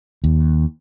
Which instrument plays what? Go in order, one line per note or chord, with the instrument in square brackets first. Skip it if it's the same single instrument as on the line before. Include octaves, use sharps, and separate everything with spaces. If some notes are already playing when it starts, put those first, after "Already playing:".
[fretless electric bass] D#2